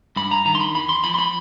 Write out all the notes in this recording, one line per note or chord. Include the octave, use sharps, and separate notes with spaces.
G2 B5
A#5
D#3 A#5
C6
B5
E2 B5
C6
F3 B5
C6
B5